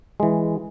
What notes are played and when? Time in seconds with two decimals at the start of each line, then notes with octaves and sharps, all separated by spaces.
0.20 E3 G#3